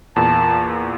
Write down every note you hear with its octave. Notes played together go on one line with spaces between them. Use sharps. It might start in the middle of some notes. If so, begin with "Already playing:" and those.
E2 A#2 A5